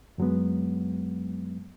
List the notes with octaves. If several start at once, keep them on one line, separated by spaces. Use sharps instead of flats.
F#2 F#3 G#3 B3